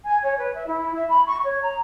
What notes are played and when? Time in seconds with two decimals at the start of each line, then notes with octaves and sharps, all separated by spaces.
0.04 G#5
0.23 C#5
0.38 B4
0.55 E5
0.67 E4
0.96 E5
1.09 B5
1.27 C#6
1.44 C#5
1.62 A#5